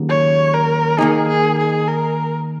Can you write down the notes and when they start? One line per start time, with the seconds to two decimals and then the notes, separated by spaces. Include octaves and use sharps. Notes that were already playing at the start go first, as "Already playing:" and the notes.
Already playing: D#2 C#3 F#3 A#3
0.09 C#5
0.54 A#4
0.98 D#3 A#3 D#4 G#4
1.28 G#4
1.58 G#4
1.88 A#4